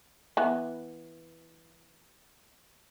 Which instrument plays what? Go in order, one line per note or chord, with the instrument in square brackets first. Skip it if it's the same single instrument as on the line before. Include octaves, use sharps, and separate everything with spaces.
[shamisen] E3 B3